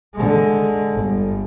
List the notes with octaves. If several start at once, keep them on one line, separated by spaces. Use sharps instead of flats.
D3 G#3
G1